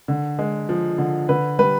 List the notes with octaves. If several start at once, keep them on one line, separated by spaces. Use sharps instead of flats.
D3
G#3
F3
D3
D3 B4
G3 B4